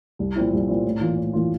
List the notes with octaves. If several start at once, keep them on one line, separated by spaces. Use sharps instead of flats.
C2
A#2 F3 C4 E4
C2
A#2 F3 C4 E4
A2
E3 A#3 F4
A2
E3 A#3 F4